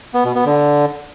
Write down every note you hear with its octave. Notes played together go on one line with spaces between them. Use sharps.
B3
B2
B3
D3